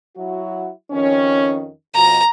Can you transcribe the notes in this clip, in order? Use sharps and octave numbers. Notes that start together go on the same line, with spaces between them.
F#3 E4 F#4
F2 D#3 C#4
F2 B2 A#5